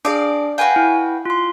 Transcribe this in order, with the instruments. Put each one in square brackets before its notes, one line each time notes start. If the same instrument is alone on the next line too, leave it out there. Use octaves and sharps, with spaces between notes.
[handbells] D4 G#4 [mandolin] D5 F5
[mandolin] F#4 B4 G5 [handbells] F5 G#5
[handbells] E4
F4 C6